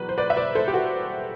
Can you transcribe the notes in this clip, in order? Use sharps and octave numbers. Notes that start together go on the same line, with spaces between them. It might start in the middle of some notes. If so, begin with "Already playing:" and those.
Already playing: E2 B2 F#3 B4
C5
B4 D5
E5
B4 D5
A4 C5
G4
F#4 A4